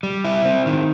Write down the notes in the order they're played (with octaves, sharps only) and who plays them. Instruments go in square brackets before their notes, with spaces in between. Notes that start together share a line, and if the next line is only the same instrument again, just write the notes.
[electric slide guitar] G3
E4
C4
D#3